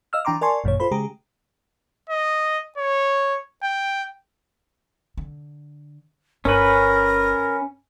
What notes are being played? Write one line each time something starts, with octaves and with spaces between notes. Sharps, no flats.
D#5 F5 E6 F6
E3 D4 G5 A#5 C6 D6
A#4 D5 G#5 A5 C6 C#6
G1 F#2 A#2 D#3 C#5
F4 A4 C5 B5
C#3 G#3 G4 G#4 A#5
D#5
C#5
G5
D3
G1 C#4 A#4 B4